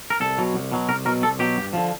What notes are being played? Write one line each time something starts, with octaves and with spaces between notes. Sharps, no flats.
A#4
C2 A4
B2 F#3
C2
B2 F#3
C2 A#4
B2 F#3 A#4
C2 A4
B2 F#3 G4
G2
D3 F3